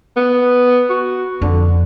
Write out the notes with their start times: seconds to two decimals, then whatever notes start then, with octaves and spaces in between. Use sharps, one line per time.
0.16 B3
0.90 F#4
1.42 F2 D3